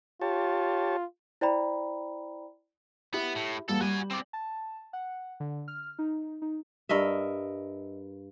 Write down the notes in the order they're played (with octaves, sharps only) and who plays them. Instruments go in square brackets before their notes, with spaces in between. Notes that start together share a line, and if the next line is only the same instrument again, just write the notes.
[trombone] F4 [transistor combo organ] G4 C#5 A5
[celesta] E4 C5 D5 G5 A#5 B5
[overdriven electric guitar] B3 [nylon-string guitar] E4 G4 E5
[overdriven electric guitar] A2
[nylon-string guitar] E2 G3 A#3 [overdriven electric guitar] A4
[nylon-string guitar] G3 [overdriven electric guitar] F#4 G#5
[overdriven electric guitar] C4 D5
[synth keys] A5
F#5
D3
F6
D#4
D#4
[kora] G2 A#4 D#5 E5